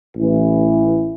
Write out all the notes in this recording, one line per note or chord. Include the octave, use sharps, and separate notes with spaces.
A1 E3